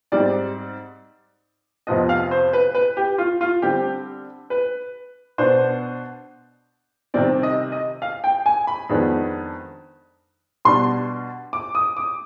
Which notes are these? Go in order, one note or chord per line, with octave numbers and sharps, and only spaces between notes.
G#2 G3 C4 D5
F2 C3 F3 B3 D#5
F5
C5
B4
B4
G4
F4
F4
D3 G3 C4 G4
B4
B2 B3 D4 C5
C3 D#3 G3 C4 D5
D#5
D#5
F5
G5
G#5
B5
F2 D#3 G#3 B3 D4
B2 G3 D4 C6
D6
D#6
D6